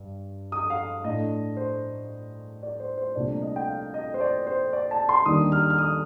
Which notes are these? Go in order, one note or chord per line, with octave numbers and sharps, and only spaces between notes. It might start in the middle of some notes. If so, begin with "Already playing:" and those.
Already playing: G2
D#6
F5
A2 A3 D4 D#5
C5
D5
C5
C5
C2 A#2 A3 D4 D5
D#5
G5
F5
D#5
C5
D5
C5
D5
A5
C6
D#2 D#3 G3 D4 D#6
F6
F6
D#6